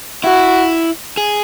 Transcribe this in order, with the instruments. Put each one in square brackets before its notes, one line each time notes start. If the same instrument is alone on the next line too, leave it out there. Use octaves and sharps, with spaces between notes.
[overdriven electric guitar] E4 [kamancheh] F#4
[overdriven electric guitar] G#4